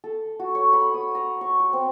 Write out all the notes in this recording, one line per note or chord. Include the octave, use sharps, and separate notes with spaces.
A4
F#4
C#5
B5
D#6
A#5
C#6
B4
C4